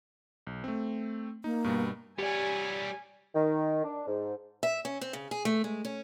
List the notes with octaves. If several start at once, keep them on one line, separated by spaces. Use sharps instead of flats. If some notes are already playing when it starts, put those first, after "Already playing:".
B1
A3 C4
A#3 D#4
G2 B2 G3
G3 G4 C#5 D5 G#5
D#3
D4
G#2
E5
C#4
C4
C#3
G#4
A3
G#3
C#4